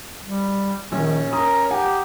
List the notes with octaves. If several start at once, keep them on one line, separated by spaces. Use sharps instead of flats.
G3
A#1 D#3 C#4
A#4 A#5 D#6
G4 F#5 G#5 A#5